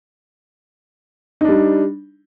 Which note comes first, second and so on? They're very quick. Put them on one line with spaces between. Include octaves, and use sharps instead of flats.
D#4 D4 G3